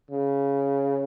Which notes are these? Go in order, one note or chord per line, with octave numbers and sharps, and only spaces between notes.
C#3